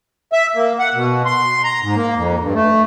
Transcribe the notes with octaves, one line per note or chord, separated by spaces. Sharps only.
E5
A#3
F#5
B2
C6
A#5
G#2
A#3
F2
G2
A3